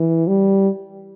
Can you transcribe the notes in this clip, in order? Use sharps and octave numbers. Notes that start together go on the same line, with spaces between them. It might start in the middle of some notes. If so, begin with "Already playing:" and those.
Already playing: E3
G3